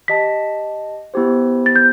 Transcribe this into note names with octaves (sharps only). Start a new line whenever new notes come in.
G4 D#5 A5 B6
B3 E4 G4 C5
A6
G6